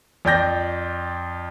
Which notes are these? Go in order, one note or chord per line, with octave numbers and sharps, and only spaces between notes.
F2 D5 G5 G6 A#6